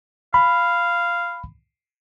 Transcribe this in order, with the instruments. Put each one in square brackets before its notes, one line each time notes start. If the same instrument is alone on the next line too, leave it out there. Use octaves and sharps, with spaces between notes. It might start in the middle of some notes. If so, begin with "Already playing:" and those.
[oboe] F5 [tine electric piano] B5